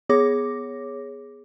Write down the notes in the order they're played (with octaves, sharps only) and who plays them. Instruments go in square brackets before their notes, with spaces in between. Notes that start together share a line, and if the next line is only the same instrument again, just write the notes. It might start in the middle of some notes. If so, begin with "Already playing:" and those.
[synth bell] B3 G#4 C#5 D6 A#6